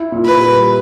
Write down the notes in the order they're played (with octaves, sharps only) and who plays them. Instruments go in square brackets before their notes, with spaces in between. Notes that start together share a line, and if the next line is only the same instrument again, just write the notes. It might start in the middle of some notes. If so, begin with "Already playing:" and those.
Already playing: [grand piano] E4
A#2
[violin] B4
[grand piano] G3